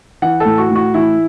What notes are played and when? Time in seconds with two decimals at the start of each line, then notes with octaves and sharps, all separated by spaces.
0.22 E3 F#5
0.40 A4
0.45 A2
0.58 F#4
0.70 A2
0.75 F#4
0.94 E3 E4